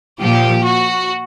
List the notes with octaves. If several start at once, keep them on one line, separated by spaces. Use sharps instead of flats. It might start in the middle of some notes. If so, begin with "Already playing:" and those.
A#2 F3 G4
F#4